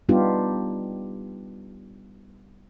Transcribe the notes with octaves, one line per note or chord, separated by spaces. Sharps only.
G3 B3 D4 D#4 F4 G4